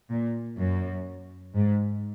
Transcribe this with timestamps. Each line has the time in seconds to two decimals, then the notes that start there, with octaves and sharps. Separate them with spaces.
0.10 A#2
0.58 F#2
1.54 G#2